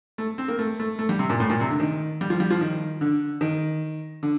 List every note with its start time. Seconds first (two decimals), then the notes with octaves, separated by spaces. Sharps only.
0.18 A3
0.38 C4
0.48 A#3
0.59 A3
0.80 A3
0.99 A3
1.09 G3
1.19 C3
1.30 A#2
1.40 A2
1.50 A#2
1.60 C3
1.70 D3
1.80 D#3
2.21 G3
2.30 F3
2.40 G3
2.51 F3
2.61 D#3
3.01 D3
3.41 D#3
4.23 D3